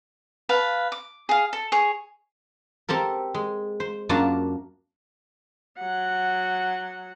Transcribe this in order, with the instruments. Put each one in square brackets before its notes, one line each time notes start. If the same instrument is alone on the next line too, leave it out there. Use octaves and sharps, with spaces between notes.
[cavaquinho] B4 F5 A5
D6
G#4 F5
A4
G#4 C#5
[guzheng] C4 G4 A4 A#4
G#3
C5
F#2 A#3 D4 F4 F#4 A5
[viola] F#3 F#5